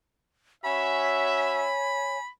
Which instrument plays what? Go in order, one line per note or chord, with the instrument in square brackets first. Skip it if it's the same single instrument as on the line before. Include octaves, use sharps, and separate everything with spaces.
[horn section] C#4 F#4 E5 [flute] C#5 [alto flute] G#5 [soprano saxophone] B5